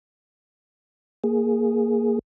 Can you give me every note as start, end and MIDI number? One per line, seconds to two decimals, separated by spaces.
1.24 2.19 58
1.24 2.19 68